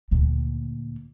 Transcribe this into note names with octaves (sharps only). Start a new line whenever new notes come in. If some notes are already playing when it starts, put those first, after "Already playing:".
D2 A#2